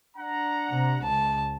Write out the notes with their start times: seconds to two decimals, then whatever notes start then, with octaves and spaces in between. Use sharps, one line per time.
0.17 D4 F#5 A#5
0.70 C3
1.03 C#2 A5